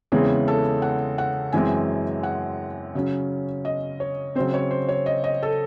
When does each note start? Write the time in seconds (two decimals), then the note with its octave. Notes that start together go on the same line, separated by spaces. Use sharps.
0.12 E2 C#3 E3 G#3 C4 G#4
0.48 A4
0.82 F#5
1.18 F#5
1.53 F#2 E3 G#3 C4 G#5
2.23 F#5
2.95 C#3 F#3 C#4
3.65 D#5
4.00 C#5
4.35 C#3 F#3 C4 C5
4.54 C#5
4.71 C5
4.88 C#5
5.06 D#5
5.24 D#5
5.43 A4